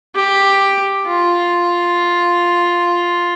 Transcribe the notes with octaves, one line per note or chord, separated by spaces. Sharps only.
G4
F4